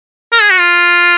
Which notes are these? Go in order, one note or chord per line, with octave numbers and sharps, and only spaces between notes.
A#4
G#4
F#4
F4